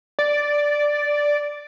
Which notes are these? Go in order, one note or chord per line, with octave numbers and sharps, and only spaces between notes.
D5